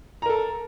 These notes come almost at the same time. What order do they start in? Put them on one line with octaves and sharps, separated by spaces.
A#5 A#4 A4